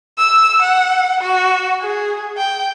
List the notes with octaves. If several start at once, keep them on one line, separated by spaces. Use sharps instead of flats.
E6
F#5
F#4
G#4
G5